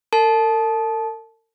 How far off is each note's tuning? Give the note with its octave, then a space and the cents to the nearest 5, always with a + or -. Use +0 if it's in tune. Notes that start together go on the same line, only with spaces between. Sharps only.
A#4 -45 A5 -20